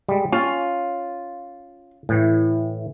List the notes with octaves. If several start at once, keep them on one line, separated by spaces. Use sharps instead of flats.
G3 G#3
C#4 F4
A2 E3